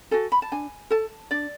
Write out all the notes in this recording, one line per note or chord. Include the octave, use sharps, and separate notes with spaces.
F#4 A4 G#5
B5
A5
D4 G#5
A4 A5
D4 D5